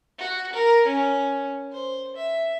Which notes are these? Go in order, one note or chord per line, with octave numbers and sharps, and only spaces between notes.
F#4
A#4
C#4
C5
E5